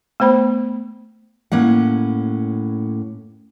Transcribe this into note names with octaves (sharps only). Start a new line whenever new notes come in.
A3 B3 C5 B5
A2 A#3 C#4 F#5